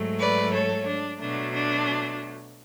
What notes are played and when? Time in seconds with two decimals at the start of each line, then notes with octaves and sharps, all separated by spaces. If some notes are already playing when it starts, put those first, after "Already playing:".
Already playing: G#2 F#3 A3
0.19 B4 D5
0.53 A4 C#5
0.87 D4
1.20 B2 F#3 A3 D4
1.54 D4